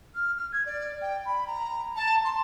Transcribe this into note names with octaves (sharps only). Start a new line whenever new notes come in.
F6
F6
G#6
D5
G5
B5
A#5
A5
C6